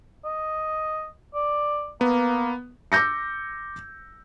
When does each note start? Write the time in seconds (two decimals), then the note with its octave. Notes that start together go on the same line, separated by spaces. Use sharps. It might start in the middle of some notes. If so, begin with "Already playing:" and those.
0.25 D#5
1.34 D5
2.01 A#3 B3
2.92 D6 E6 G6 A#6 C#7